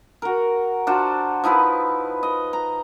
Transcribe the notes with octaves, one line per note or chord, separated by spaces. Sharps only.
F#4 A#4
D4 F4 F#4 C5
F3 D#4 E4 B4
D#5
A#5